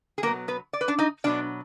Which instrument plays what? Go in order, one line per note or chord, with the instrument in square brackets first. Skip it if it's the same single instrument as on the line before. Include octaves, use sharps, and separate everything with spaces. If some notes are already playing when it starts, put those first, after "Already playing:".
[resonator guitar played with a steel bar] G#4
B2 F#3 A#3 B3 A#4
B3 B4
D5
B4
D4 D5
D#4 D#5
B2 F#3 B3 D4 D5